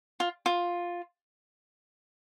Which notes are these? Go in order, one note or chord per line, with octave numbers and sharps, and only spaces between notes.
F4
F4